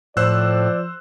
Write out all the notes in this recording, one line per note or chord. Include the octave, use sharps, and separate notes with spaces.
A2 F3 C5 D5 E6 F#6